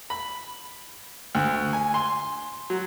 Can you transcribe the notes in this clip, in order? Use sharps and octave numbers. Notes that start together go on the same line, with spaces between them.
B5
D2
G#5
C6
F#3